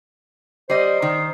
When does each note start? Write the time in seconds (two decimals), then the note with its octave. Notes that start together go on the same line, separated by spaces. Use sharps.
0.70 G3 C5 D#5
1.02 D#3